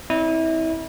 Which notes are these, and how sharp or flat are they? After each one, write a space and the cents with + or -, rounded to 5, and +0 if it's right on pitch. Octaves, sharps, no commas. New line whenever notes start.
C4 +0 E4 -30 D5 +0